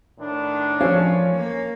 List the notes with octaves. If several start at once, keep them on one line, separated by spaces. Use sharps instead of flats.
A2 D#3 D4
F3 C#4 A4 C5 F5
A#3